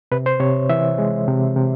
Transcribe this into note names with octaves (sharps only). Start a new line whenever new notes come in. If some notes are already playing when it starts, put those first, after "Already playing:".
C3 B4
C5
C3 C#5
E3 E5
G#3
C3
C3